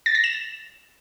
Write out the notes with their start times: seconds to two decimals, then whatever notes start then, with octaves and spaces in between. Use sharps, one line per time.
0.06 A6
0.15 A#6
0.24 E7